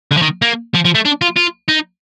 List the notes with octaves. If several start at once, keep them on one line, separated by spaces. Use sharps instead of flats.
D3
F3
D#3
A#3
F3
F3
A3
D4
F4
F4
D#4